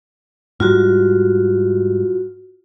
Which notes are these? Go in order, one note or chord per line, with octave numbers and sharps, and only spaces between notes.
G#2 G3 F4 F#4